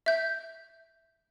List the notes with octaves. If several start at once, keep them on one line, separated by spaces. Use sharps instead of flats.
E5 G6